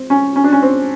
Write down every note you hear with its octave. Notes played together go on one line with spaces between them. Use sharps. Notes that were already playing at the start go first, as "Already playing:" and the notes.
Already playing: C4
C#4
C#4
D4
C#4
C4